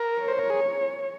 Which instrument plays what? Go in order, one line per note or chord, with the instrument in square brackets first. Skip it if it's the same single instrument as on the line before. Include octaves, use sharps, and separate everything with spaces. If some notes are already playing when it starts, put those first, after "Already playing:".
Already playing: [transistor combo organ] A#4
[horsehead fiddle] C#5
[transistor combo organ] C5
A#4
G#4